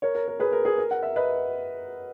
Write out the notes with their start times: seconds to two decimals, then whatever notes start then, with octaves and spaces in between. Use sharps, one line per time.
0.02 A#4 C#5
0.15 A#4
0.28 A#4
0.40 G#4 B4
0.52 A#4
0.65 G#4
0.78 A#4
0.91 F#5
1.03 E5
1.16 B4 D#5